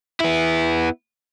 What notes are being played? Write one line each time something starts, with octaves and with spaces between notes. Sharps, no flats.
B3 E4